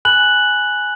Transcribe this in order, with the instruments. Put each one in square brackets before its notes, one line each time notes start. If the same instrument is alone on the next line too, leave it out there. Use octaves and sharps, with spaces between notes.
[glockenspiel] G#5 B5 F#6 F#7